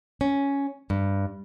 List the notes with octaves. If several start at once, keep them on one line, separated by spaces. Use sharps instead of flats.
C#4
G2